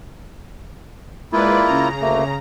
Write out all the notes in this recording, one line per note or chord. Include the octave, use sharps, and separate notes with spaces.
G#3 A#3 E4 F4 B4 D5
C#3 A#5
D2 A3 A#3